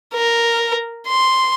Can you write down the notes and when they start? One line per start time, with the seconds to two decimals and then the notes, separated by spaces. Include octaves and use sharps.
0.14 A#4
1.08 C6